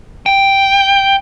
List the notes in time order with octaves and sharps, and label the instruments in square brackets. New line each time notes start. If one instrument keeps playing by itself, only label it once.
[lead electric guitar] G5